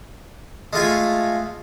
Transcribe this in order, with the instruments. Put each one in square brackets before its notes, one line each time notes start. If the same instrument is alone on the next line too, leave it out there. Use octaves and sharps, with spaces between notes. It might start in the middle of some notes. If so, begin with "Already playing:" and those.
[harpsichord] G#3 A3 F4 G#5